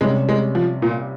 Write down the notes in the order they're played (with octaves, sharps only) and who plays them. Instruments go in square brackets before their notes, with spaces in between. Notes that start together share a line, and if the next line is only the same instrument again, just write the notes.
[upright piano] C3 G3 C#4 [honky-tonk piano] G#3
[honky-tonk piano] G#3
F3
A#2